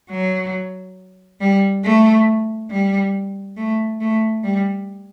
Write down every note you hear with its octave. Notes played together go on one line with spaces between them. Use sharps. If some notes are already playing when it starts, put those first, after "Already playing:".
F#3
G3
A3
G3
A3
A3
G3